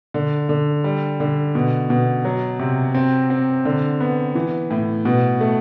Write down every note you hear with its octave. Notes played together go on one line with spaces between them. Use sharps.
D3
D3
G3
D3
B2
B2
F#3
C3
C4
C4
D3
B3
E3
A2
B2
A3